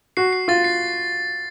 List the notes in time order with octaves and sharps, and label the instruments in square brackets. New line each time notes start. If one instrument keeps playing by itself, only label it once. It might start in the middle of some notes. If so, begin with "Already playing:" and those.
[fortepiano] F#4 [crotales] C7
[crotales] C7
[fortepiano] F4 [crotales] A6
[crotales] C7